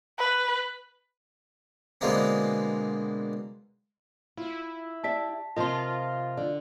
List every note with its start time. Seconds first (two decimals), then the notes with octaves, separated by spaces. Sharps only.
0.18 B4
2.01 B2 D3 G#3 A#3 C4
4.37 E4 F4
5.04 G4 D5 E5 A5 B6
5.56 C3 F3 F4 A#4 D#5 C6
6.37 D3 D5